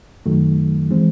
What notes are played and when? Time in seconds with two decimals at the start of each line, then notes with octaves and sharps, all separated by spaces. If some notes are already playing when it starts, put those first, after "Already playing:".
0.26 F#2 D#3 F#3 A3
0.91 E3 G#3 C4